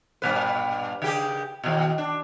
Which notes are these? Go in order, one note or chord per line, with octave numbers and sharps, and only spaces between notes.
G2 A#2 B4
C#3 G4 G#4
D#2 B2
D4